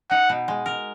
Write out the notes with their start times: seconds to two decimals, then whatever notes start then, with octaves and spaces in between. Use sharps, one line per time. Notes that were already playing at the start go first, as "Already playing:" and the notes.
0.11 D#4 F#5
0.29 B2
0.48 G#3
0.66 A#4